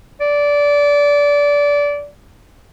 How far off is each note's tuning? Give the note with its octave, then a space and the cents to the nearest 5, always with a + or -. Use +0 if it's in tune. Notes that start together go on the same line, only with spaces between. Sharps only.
D5 -20